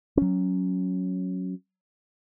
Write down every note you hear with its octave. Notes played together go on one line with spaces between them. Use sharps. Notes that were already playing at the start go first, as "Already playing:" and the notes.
F#3 C#4